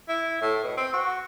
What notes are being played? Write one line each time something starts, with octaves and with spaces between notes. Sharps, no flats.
E4
A2
B2
C4
F#4